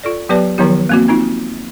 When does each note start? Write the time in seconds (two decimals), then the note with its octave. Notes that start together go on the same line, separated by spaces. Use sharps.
0.04 F4 A4 D5
0.29 F#3 B3 G4 B4 D5 A5
0.58 D#3 F3 F#3 B3 E4 G4
0.89 A#3 C4 F#4
1.08 C4 D#4 F4